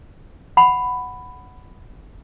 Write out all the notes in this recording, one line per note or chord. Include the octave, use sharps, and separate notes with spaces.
F#5 B5